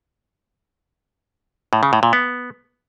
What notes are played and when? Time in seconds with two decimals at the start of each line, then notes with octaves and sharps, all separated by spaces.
1.73 A2
1.83 C#3
1.93 A2
2.03 A#2
2.13 B3